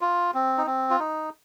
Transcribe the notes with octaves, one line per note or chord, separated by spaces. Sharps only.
F4
C4
D#4
C4
F4
D#4